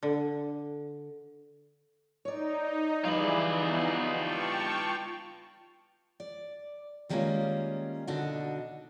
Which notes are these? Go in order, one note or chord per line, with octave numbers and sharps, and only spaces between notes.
D3
D#4 C#5 D5
F2 E3 G3 E4 F4 G#4 B4 D5
E3 B3 D#4
G5 A5 C#6
D5
D#3 G3 G#3 A#3 C#4 F4
B2 D3 D4 D#4 F#4